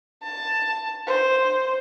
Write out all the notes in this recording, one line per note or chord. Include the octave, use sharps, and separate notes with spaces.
A5
C5